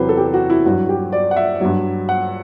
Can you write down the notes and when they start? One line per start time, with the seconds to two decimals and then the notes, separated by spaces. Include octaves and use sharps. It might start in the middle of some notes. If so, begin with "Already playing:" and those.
Already playing: E2 C3 F#3 B4 C5
0.09 A4
0.17 G4
0.34 F#4
0.50 E4
0.65 G2 F#3 F#4
0.89 G4
1.12 D5
1.31 F#5
1.37 E5
1.61 G2 F#3
2.09 F#5